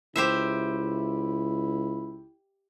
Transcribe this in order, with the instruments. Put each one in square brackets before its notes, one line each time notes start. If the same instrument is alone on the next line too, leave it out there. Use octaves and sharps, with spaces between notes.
[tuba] C#2 [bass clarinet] E4 [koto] G4 C5 E5